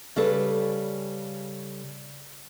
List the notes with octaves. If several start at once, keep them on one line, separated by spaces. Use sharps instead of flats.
C#3 G3 G#4 A4 B4